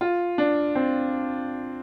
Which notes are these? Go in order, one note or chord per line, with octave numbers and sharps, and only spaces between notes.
F4
D4
C4